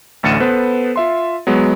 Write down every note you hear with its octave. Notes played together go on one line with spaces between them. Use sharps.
A1 D2 A6 C#7 D#7 E7
B3 A4 B4 C5
F4 E5 C6
F#3 G#3 B3